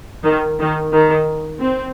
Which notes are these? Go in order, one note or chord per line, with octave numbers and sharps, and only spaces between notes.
D#3
D#3
D#3
C4